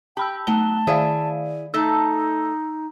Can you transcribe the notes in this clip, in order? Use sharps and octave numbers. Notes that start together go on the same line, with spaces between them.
G4 G5 A5 B5 E6
F#3 A3 B3 A5 G7
D#3 E4 G#4 D5 E5 F5
A3 D#4 A4 E6